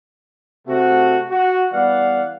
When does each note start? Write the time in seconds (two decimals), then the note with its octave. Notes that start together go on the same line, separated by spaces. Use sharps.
0.67 C3 A3 F#4
1.31 F#4
1.72 E3 G3 B3 D5 F5 F#5